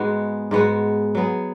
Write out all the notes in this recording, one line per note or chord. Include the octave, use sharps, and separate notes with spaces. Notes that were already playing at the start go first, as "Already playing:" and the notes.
Already playing: G#2 G#3 B3 F#4
G#2 G#3 B3 F#4
F#3 B3 G#4